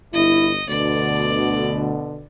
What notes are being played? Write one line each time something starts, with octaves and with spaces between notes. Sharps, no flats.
G1 E4 D#5
D2 B2 D3 D5